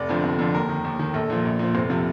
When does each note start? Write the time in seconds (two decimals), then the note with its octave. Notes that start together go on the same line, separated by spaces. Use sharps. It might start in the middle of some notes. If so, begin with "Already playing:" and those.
Already playing: F1 D5
0.09 F2 D3 F3
0.24 F1
0.39 F2 D3 F3
0.54 D#2 A#4
0.69 D#3
0.85 D#2
0.99 D#3
1.14 A#1 A4
1.30 A#2 F3
1.45 A#1
1.59 A#2 F3
1.74 F1 C4
1.90 C3 F3